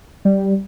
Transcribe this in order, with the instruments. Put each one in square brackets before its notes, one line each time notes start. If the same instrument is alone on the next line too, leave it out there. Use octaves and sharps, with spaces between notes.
[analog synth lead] G3